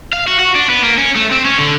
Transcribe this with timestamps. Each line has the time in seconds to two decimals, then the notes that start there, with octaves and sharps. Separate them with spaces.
0.13 F5
0.28 F#4
0.39 F#4
0.55 D4
0.70 B3
0.83 A#3
0.98 C#4
1.16 A3
1.32 C4
1.46 C#4
1.59 D3